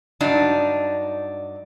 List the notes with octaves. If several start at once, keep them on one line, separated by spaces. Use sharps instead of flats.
G2 F#3 D4 D#4